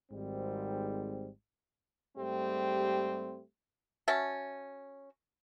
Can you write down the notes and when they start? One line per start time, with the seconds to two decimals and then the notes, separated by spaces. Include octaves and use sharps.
0.11 G#1 G#2 G3 C4
2.17 G#2 G3 A3 C4 G4
4.08 C#4 F#4 E5 A5